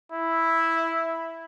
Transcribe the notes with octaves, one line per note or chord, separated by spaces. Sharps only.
E4